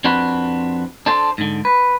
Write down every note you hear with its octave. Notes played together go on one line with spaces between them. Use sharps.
F2 C4 D4 F#4 B4
D4 A4 C5
G#2 D3
B4